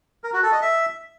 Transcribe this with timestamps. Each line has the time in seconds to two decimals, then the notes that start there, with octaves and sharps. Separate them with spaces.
0.24 A#4
0.33 F#4
0.43 A4
0.52 D#5
0.62 E5